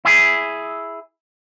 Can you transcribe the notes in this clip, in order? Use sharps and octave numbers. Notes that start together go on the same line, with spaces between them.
E4 G#4